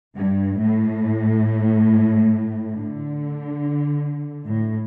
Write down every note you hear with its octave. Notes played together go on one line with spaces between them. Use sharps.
G2
A2
D3
A2